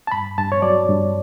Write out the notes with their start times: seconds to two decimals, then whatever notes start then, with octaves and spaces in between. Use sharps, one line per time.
0.07 A5
0.12 G2 B5
0.38 G2 A5
0.52 C#5
0.62 F#3 D5
0.89 G2